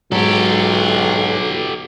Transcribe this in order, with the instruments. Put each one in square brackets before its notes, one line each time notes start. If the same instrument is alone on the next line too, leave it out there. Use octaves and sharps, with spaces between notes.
[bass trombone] B1 [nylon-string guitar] G#2 F#3 [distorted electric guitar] G4 A4